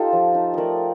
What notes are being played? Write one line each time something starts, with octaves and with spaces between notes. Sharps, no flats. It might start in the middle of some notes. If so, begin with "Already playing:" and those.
Already playing: D#4 F4 G4 A4 F5
F3
D#4
A3 A#4 D5 D#5